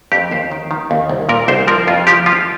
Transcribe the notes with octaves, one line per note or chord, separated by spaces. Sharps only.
F2 G4
D#2 C5
D#3
D#3
D#2
C2
A#2 A#4
C2 C5
F3 A#4
F2 F4
F3 G4
F3 F4